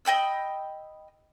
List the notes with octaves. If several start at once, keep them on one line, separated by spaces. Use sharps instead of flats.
D#5 G5 B5 E6